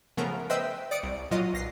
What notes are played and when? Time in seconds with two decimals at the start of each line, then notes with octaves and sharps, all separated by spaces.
0.17 C#3 F3 A3 B3 A#4
0.50 B4 C5 D#5 E5 G5 E6
0.91 D5 D#6 C#7 D7
1.03 C2
1.31 A#2 F#3 F4 D#5
1.54 B1 A#6 C7